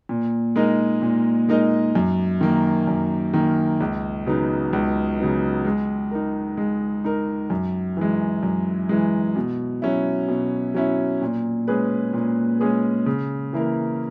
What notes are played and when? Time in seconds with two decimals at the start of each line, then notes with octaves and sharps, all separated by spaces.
0.09 A#2
0.56 G#3 D#4 A#4 D#5
1.02 A#2
1.49 G#3 D#4 A#4 D#5
1.95 F#2
2.41 D#3 A#3
2.87 F#2
3.34 D#3 A#3
3.80 C#2
4.27 C#3 F#3 B3 D#4
4.73 C#2
5.18 C#3 F#3 B3 D#4
5.65 G#3
6.11 D#4 A#4
6.57 G#3
7.04 D#4 A#4
7.50 F#2
7.97 E3 G#3
8.43 F#2
8.89 E3 G#3
9.36 B2
9.82 F#3 C#4 E4
10.28 B2
10.74 F#3 C#4 E4
11.22 A#2
11.68 G#3 C#4 G#4 B4
12.14 A#2
12.60 G#3 C#4 G#4 B4
13.06 C#3
13.53 E3 A#3 E4 A#4